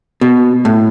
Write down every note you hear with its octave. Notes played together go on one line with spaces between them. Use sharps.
B2
A2